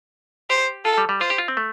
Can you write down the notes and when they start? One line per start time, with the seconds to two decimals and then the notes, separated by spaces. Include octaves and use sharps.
0.50 G4 C5
0.85 F4 A4
0.98 G3
1.09 G3
1.21 F4 C5
1.30 G4
1.38 F4
1.48 C4
1.57 A3